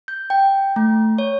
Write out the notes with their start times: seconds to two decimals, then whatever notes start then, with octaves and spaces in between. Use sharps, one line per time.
0.08 G6
0.30 G5
0.76 A3
1.18 C#5